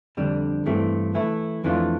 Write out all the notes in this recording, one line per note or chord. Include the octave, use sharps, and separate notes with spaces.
F2 D3 G3 D4
G2 E3 A3 C4
E3 A3 E4
F2 E3 A3 D4 F4